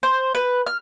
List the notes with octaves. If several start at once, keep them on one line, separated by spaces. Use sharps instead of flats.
C5
B4
F6